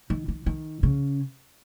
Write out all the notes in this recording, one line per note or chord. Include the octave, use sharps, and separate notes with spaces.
D#3
D#3
D#3
C#3